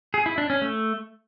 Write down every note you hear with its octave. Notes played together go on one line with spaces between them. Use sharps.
G#4
E4
D4
C#4
A3